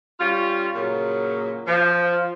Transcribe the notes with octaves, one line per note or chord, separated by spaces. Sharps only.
G3 C#4 F4
A#2 C#3 F#3
F3